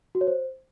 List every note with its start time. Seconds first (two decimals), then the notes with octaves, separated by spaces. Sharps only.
0.15 F#4
0.21 C#5
0.27 C5